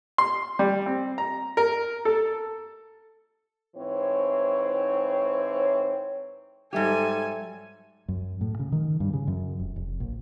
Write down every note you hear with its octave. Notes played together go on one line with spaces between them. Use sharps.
C6
G3
C4
A#5
A#4
A4
G#2 E3 C4 C#5
G#2 F#3 G3 G4 A4 E5 G#5
F#2
A2
C#3
D#3
G2
C#3
F#2
F1
F1
A#1